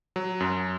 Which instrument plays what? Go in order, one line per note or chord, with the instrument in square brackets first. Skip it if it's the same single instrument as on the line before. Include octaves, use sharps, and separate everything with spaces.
[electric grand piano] F#3
F#2